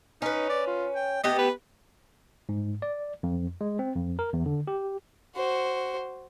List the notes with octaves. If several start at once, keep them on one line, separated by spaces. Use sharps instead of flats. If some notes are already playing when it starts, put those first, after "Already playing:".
C#4 D#4 B4
D5
F4
G5
A3 B3 G4 D#5
B4
G#2
D5
F2
G#3
C4
F2
A#4
E2
D3
G4
F#4 C5